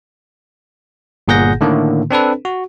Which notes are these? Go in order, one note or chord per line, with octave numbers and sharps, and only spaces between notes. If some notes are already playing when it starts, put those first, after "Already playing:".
G1 A#2 G#4 F#5 G6 A#6
A2 D3 D#3 A3 A#3
C4 D4 A4 B4
F#4